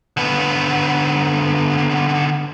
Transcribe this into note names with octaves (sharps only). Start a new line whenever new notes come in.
D3 B3